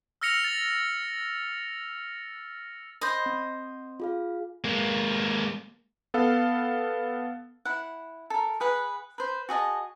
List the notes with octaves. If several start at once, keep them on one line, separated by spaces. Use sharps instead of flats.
E6 F6 A#6 C#7 F7
A6
C5 D#5 B5
C4
F4 G#4 F5
G#3 A#3
B3 A4 F5
E4 F#5
A4 A#4
G#4 B4 F#5
B4 C5
F#4 G#4 D#5 A5